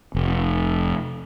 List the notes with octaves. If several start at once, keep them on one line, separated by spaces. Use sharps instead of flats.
F1